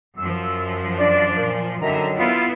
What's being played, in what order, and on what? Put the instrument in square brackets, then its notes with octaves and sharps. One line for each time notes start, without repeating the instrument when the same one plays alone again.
[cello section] F#2 F3 [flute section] E6
[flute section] D4 [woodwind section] D5
[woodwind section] A#2
[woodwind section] F#2 D#3 F#3 [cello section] D3 [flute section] E5 A#5
[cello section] B3 E4 [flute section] F4